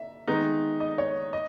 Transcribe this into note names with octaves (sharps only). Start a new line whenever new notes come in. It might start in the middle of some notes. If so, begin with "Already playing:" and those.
Already playing: E5
D#3 G#3 B3 D#4
D#5
C#5
D#5